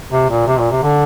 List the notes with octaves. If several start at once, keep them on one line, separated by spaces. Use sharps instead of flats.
C3
A#2
C3
A#2
C3
D3